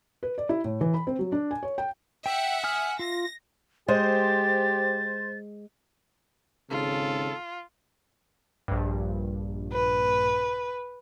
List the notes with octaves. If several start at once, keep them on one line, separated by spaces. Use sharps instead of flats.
B4
D5
E4
A2
E3
B5
C4
F#3
D4
G#5
C#5
G5
E5 F#5 G5
G#5 D#6 F6
F4 A#6
G#3 G4 C5 A6
G#1 C#3 F4 A4
A#1 G2
B4